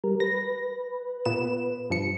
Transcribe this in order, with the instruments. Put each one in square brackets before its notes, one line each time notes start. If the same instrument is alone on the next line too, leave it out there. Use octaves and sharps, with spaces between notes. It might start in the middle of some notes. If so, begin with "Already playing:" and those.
[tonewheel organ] G3 A#4
[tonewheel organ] B4 [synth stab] A#6
[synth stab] A#2 B3 E7
G2 F3 C#7